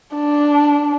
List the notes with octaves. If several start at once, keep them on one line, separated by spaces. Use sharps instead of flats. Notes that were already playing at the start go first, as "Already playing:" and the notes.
D4